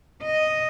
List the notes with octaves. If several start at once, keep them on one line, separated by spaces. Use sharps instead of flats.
D#5